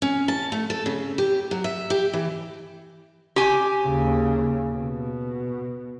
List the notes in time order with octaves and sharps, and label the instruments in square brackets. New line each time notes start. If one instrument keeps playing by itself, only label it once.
[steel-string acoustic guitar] C#4
A5
A3
A4
C#3
G4
F#3
E5
G4
E3
[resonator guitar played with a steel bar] G4 G#5
[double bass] D#2 C#3
B2